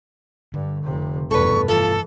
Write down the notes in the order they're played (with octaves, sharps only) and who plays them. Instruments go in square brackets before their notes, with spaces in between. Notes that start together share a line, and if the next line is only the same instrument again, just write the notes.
[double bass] G2 [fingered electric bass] D3
[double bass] F1 C3
[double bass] F1 E2 [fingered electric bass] G2 B2 [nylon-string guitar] A4 B4 [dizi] C#6
[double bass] E3 [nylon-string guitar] F3 [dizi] A4